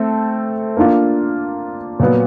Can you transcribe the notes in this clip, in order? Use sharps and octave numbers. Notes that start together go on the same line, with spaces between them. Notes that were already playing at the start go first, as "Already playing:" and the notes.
Already playing: A3 C4 A4
A#3 D4 F4
A#2 F#3 B3